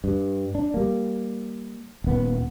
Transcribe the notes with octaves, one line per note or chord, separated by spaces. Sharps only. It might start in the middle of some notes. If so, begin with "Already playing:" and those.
G2
D4
G3 A#3
D#1 B3